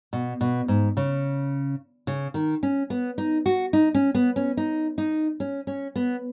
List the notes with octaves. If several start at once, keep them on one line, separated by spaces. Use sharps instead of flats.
B2
B2
G#2
C#3
C#3
D#3
C#4
B3
D#4
F#4
D#4
C#4
B3
C#4
D#4
D#4
C#4
C#4
B3